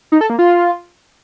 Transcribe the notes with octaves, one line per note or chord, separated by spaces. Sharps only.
D#4
A4
A#3
F4